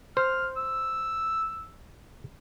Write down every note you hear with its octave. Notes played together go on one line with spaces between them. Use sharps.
C5 F6
E6